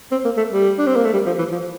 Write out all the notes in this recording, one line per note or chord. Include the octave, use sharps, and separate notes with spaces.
C4
A#3
A3
G3
D4
C4
A#3
A3
G3
F3
E3
F3